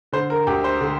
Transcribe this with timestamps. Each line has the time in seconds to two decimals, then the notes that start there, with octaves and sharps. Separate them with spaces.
0.12 D3 C5
0.30 A#4
0.47 D2 G4
0.64 C5
0.81 D3